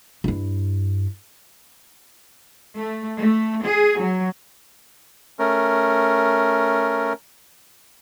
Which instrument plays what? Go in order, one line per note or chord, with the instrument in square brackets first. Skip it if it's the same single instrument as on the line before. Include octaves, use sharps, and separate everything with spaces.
[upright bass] G2 E4
[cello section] A3
A3
G#4
F#3
[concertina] A3 C#4 A#4